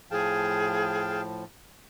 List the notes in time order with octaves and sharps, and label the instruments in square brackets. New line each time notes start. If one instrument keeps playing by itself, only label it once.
[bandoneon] A2 F3 [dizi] G#4 [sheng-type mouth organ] F5 G5 A5